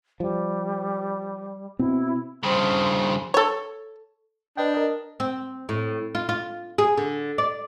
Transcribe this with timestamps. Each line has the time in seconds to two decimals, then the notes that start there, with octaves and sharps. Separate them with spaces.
0.20 F3 G3
1.79 B2 C4 E4
2.43 G2 C#3 C5
3.34 A4 C#5
4.57 D4 B4 D#5 G5
4.74 A#4 D#5
5.20 C4
5.69 A2
6.15 F4
6.29 F4
6.78 G#4
6.98 D3
7.38 D5